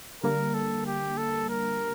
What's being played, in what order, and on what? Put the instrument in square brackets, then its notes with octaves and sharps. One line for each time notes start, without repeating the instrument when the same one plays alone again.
[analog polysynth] D3 G3 A#3 [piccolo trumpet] A#4
[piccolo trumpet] A4
G4
A4
A#4